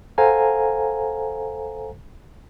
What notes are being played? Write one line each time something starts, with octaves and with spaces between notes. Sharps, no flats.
A4 C5 F5 F#5 G#5 A#5